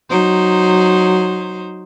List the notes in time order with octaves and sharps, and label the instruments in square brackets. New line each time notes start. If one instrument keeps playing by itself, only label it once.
[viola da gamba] F#3 D#4 C5